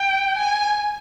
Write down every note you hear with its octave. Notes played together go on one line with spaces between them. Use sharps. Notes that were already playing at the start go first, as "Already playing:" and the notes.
Already playing: G5
G#5